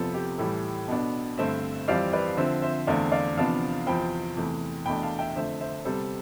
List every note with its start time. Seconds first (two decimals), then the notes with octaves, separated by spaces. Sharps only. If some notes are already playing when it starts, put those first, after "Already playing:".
Already playing: F2 C3 F3 B3 A4
0.14 G4
0.38 A2 E3 G3 A4
0.88 B2 B3 D4
1.38 G2 D3 A3 C4 C5 E5
1.88 F2 E3 G3 C4 D5 F5
2.13 B4 D5
2.37 D3 F3 C4 C5 E5
2.62 C5 E5
2.87 E2 D3 A3 C4 D5 F5
3.12 D5 F5
3.37 E2 C3 F3 B3 D4 F5 A5
3.86 E2 C3 F3 C4 G5 B5
4.36 E2 C3 E3 A3
4.86 E2 B2 A3 D4 G5 B5
5.03 F5 A5
5.19 E5 G5
5.36 F2 D3 A3 C5 E5
5.60 C5 E5
5.85 C3 G3 B3 A4 C5